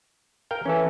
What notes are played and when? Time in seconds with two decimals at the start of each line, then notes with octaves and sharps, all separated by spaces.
0.51 A#4 F5 G5
0.66 E3 C#4 A4